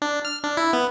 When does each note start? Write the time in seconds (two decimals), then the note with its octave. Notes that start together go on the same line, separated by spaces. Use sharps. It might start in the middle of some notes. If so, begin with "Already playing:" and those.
0.02 D4
0.25 F6
0.44 D4
0.57 E4
0.73 B3